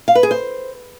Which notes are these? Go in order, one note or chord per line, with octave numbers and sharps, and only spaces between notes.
F5
B4
G#4
C5